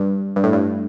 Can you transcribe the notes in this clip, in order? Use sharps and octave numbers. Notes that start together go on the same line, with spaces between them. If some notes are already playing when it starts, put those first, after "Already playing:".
Already playing: G2
G2
A2
G2